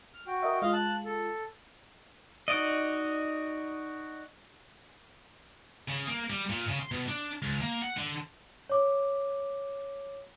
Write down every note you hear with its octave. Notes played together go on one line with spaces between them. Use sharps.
F6
F#4 G5
A#4 D#5 E5
G#3 F4 D#5 F5
A5 F#6
A4
D#4 F#4 D5 D#5
C#3
A#3
G3
A#2
C#3
C6
B2
D4
C#2
A#3
F#5
D3
C#5 D6